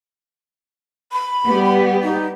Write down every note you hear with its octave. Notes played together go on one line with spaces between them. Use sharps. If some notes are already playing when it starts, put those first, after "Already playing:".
B5
G3 B3 G4
D#4